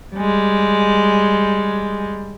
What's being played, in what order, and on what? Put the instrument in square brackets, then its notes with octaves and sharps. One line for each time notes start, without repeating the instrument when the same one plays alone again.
[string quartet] G3 G#3